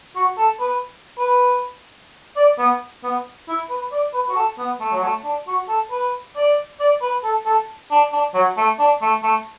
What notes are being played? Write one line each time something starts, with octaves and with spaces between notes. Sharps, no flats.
F#4
A4
B4
B4
D5
B3
B3
E4
B4
D5
B4
F#4
A4
B3
A3
F#3
A3
D4
F#4
A4
B4
D5
D5
B4
A4
A4
D4
D4
F#3
A3
D4
A3
A3